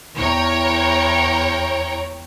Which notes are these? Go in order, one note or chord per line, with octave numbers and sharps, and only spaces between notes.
E2 C#5 G5 A#5